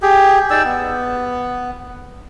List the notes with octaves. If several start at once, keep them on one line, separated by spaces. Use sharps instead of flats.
G4 G#4
D#4 G#4 D5 E6
B3